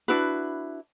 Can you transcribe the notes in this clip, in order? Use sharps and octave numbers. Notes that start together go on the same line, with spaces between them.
D4 E4 F#4 B4